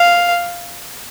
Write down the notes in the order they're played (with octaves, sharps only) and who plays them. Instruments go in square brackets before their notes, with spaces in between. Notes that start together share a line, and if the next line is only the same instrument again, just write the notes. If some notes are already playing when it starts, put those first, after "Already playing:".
Already playing: [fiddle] F5